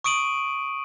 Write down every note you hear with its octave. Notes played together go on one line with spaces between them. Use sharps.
C#6 D#6 D7 D#7 F#7